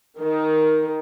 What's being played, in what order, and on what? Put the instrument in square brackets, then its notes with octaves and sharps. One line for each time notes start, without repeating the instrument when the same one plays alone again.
[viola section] D#3